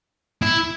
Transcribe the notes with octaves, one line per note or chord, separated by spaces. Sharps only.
E4